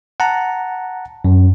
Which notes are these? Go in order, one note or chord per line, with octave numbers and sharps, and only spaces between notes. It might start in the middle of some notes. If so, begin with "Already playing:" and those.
F#5 A5 A#5
F#2